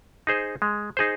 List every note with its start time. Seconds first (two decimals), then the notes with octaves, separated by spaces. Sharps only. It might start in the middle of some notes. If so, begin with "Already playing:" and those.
0.27 D#4 G#4 C5
0.62 G#3
0.97 D#4 G#4 C5